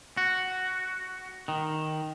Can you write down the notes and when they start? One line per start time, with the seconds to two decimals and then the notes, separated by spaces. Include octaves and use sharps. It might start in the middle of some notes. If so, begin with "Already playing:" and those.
0.17 F#4
1.48 D#3